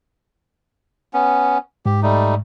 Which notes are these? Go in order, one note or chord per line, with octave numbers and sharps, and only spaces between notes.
B3 C#4
G#2 G4
G3 A3 D#4